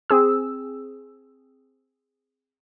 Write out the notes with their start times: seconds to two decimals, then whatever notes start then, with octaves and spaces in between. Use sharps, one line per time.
0.10 C4 G#4 E6